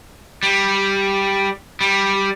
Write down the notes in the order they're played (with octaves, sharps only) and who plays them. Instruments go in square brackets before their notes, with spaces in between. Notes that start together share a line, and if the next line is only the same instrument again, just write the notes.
[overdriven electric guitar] G3
G3